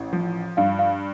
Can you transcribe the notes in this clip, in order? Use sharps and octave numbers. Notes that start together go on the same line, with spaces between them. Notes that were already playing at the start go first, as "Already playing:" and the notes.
Already playing: A1
F3
G2 F5
F5